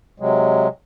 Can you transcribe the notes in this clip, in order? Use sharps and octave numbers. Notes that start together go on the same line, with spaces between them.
C3 F#3 G#3